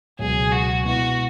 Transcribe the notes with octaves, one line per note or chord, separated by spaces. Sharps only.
C#2 B2 F#3 G#4
F#4
B2 G#3 B3 E4 F#4